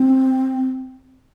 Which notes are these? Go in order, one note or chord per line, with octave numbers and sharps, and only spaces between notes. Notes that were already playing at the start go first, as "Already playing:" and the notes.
Already playing: C4